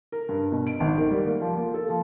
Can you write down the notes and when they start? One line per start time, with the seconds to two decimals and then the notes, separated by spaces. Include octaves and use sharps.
0.12 A#4
0.29 G2
0.52 B2
0.67 D7
0.80 G#1
0.98 D#3
1.11 G3
1.26 A#3
1.41 F3
1.57 A#3
1.74 A4
1.90 F3